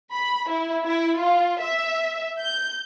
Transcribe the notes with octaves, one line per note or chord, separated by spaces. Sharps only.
B5
E4
E4
F4
E5
G6